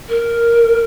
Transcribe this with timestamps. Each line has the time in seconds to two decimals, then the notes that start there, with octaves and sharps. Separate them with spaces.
0.09 A#4